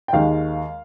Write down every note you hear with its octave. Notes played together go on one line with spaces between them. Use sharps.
G5
D#2 D#3 G#3 F5